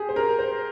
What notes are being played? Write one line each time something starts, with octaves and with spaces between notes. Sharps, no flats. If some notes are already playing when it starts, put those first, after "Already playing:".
Already playing: G4 G#4
C5
A#4
C5